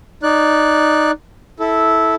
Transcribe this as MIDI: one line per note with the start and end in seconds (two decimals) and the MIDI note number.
0.23 1.11 63
0.23 1.11 74
0.23 1.11 90
1.60 2.15 64
1.60 2.15 69